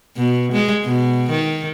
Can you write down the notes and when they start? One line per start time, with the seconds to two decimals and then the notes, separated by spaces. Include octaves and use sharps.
0.16 B2
0.52 G#3
0.84 B2
1.30 D#3